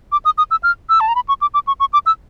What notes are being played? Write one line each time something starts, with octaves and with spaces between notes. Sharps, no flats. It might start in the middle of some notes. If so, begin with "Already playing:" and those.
D6
D#6
D#6
E6
F6
E6
A5
A#5
B5
C#6
D6
D6
C#6
C#6
D6
E6